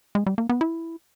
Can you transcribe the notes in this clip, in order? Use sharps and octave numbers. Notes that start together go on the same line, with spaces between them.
G#3
G3
A#3
B3
E4